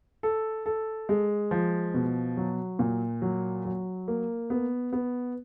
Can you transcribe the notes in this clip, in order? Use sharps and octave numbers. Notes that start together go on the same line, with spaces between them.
A4
A4
G#3
F3
B2
F#3
A#2
F#3
F#3
A#3
B3
B3